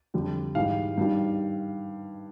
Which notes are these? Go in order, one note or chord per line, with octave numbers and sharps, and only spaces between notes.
F2 D3 G3
G#2 E3 G3 F5
G2 D#3 G3